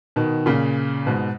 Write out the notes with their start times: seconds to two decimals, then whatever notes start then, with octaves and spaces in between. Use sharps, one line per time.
0.16 B2 D#3
0.46 A#2 C#3
1.06 G#2 B2